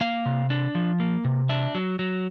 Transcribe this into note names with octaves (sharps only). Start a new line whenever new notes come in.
A#3 F5
C3
D4
F3
A#3
C3
D4 E5
F#3
F#3